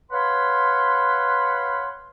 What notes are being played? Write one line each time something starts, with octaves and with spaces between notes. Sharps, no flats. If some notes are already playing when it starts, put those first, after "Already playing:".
B4 C#5 F5 F#5 B5 C6